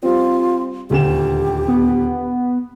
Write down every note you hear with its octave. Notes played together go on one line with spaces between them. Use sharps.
G3 C4 F4
D#1 D2 G4 E7
B3